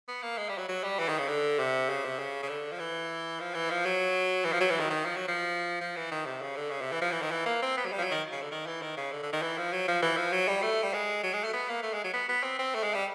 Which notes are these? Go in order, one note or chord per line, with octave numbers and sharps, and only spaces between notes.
B3
A#3
G#3
G3
F#3
F#3
G3
E3
D#3
C#3
D3
C3
C#3
C3
C#3
C#3
D3
F3
E3
F3
E3
F3
F#3
E3
F3
F#3
E3
D#3
D#3
F3
F#3
F3
F3
E3
D#3
C3
C#3
D3
C#3
C3
E3
F3
E3
D#3
E3
A#3
C4
B3
F#3
G3
F3
F#3
D#3
C#3
D3
D#3
E3
D#3
C#3
D3
D3
D#3
E3
F3
F#3
F3
E3
F3
F#3
G3
A3
G3
G#3
F#3
G#3
A3
B3
A#3
A3
G#3
F#3
B3
B3
C4
C4
A3
G#3
G3